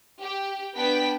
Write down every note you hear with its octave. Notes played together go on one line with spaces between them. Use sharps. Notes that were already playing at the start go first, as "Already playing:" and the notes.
G4
B3 D4 G5 B6